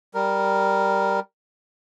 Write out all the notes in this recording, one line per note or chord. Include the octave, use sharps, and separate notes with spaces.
G3 A#4